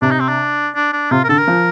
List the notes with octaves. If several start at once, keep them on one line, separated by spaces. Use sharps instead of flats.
C3 D4
D#4
C4
D4
D4
D4
C3 F4
A#4
D3 A4
A#4
F3